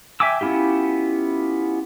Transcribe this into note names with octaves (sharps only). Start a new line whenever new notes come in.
E5 G5 G#5 D6 E6
B3 C#4 E4 F4 G4